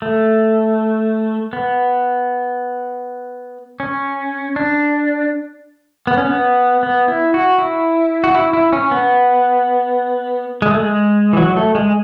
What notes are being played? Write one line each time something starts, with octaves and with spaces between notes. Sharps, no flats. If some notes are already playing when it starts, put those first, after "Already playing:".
A3
B3
C#4
D4
B3
C#4
B3
B3
E4
F#4
E4
F#4
E4
E4
C#4
B3
G#3
A3
G#3
E3
F#3
A3
G#3